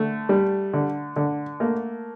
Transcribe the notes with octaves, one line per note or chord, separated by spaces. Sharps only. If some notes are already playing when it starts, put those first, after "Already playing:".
Already playing: D3 A3
G3
D3
D3
A3 A#3